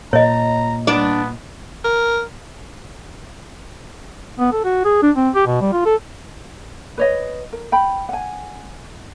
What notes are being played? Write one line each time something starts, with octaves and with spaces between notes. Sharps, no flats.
A#2 C#5 D#5 A#5
B3 D4 D5
A#4
B3
A4
F#4
G#4
D4
C4
G4
B2
G3
F4
A4
B4 C#5 D#5
A#4
G5 B5
F#5 G#5